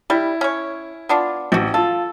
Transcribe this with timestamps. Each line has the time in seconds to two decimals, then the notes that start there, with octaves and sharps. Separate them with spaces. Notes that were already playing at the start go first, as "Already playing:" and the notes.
0.10 G3 E4
0.41 C#4 C#5
1.09 B3 D4 F4
1.52 A1 C4 F#4
1.74 F4 A4